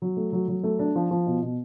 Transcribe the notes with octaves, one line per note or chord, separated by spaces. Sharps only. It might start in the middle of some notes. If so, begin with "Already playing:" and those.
F#3
A3
F#3
F#3
A3
D4
F3
F3
B2
B2